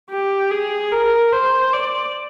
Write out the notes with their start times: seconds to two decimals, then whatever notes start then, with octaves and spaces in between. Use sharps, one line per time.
0.10 G4
0.51 G#4
0.92 A#4
1.33 C5
1.73 D5